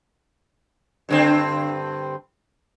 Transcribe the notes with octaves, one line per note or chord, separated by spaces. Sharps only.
G2 D3 C4